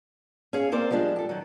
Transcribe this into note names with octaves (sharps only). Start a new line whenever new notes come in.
C#4 G#4 F5
A#3 C4 A#4 C5 D5
F3 G3 G#3 D4
G4 A4
D#3 F#3